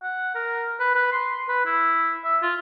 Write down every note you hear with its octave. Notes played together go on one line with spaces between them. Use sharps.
F#5
A#4
B4
B4
C6
B4
E4
E5
F4